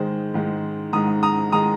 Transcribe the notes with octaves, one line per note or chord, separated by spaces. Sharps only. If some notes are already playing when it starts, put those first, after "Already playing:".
Already playing: G#2 D#3 G#3 C5
G#2 D#3 G#3
G#2 D#3 G#3 A#5 D#6
A#5 D#6
D#3 G#3 A#5 D#6